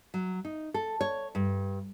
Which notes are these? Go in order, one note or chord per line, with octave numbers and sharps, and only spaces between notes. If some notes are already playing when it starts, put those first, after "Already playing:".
F#3
D#4
A4
C#5
G2